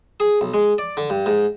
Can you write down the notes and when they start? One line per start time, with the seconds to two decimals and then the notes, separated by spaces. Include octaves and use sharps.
0.20 G#4
0.41 B1
0.54 G#3
0.78 D5
0.97 D3
1.10 G2
1.26 G#2